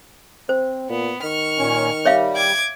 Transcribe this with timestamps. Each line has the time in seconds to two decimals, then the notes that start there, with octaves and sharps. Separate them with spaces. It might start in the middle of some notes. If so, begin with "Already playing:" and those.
0.49 C4 C5
0.90 A#2 B3
1.24 D#3 C#6 F6
1.59 A#2 C#4
2.05 G3 C#5 E5 F5
2.36 D6 G#6